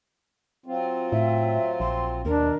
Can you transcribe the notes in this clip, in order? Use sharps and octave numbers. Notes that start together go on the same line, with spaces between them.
F#3 C4 F4
A2 E5
A#1 C6
D#2 B2 D4 A#4